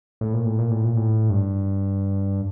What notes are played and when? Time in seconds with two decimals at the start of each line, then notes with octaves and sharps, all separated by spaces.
0.21 A2
0.33 A#2
0.46 A2
0.59 A#2
0.71 A2
0.84 A#2
0.97 A2
1.30 G2